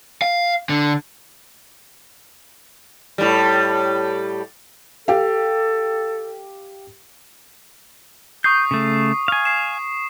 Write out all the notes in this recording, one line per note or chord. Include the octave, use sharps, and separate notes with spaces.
F5
D3
A2 G3
G4 A4 F5
C#6 D#6 G6 C7
C#3 A3
F5 G#5
C7 E7